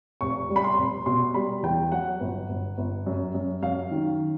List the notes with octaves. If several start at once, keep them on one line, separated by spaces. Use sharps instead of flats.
F1 C#6
G3
B5
C6
F1
B2 C6
G3 B5
E2 G5
F#3 F#5
G1
G1
G1
F#2
F#2
F#2 F5
D#3